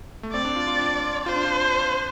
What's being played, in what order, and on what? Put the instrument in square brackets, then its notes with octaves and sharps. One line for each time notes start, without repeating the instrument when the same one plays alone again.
[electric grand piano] A3
[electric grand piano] C4 [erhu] D5
[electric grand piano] D4
F4
F4
D4
[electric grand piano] F4 [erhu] C5
[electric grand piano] D4
F4